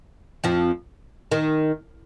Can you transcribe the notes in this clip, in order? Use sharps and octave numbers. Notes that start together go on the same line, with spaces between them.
F2 F3
D#3